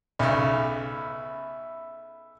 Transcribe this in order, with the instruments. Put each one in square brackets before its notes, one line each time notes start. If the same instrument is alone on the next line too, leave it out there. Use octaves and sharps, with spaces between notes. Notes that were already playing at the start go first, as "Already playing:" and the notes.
[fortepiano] B1 C#3 [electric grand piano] E5 B5